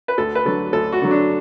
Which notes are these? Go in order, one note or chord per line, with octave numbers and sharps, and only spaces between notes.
B4
D2 A4
B4
D3 F#3 A4
D2 A4
F#4
D3 F#3
D4